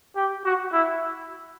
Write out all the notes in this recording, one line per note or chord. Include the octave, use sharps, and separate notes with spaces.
G4
F#4
E4